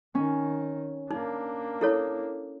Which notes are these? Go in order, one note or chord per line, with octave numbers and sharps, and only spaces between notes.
D#3 C#4
A#3 D4 D#4
E4 A4 C#5